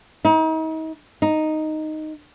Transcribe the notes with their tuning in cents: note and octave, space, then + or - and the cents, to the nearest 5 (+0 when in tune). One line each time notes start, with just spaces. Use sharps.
D#4 +40
D#4 -5